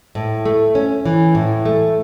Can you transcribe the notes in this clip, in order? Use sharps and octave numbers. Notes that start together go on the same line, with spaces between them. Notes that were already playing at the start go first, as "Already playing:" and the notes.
A2
A3
C#4
E3
A2
A3